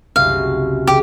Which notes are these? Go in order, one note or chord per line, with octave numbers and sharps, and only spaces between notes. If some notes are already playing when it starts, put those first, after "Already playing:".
F#1 C2 F5
F#4
C#3 G4